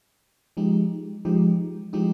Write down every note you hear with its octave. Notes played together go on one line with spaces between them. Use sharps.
F3 G#3 D#4 G4
F3 G#3 D#4 G4
F3 G#3 D#4 G4